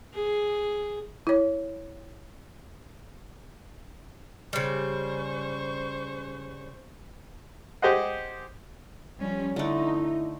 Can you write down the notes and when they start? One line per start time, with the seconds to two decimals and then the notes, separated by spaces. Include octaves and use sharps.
0.14 G#4
1.27 E4 C#5
4.53 C#3 G3 C5 C#6
7.82 G4 G#4 C5 D#5 F#5
9.19 F3 G3 C#4
9.56 D3 A3 D#4 E4